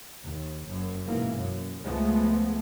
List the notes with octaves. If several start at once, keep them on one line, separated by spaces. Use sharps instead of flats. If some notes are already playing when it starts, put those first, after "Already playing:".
D#2
F#1 F#2
G#2 B2 E3 A#3
F#2
C#2 F3 G#3 A3 B3